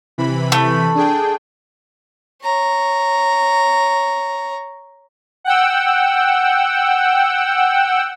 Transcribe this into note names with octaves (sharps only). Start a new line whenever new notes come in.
C3 E3 B5
A3
D4 G#4 G5
C#5 A#5
F#5 G5 E6